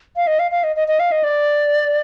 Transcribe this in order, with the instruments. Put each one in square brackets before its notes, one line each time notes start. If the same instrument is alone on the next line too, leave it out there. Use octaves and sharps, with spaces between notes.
[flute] F5
D#5
F5
F5
D#5
D#5
D#5
F5
D#5
D5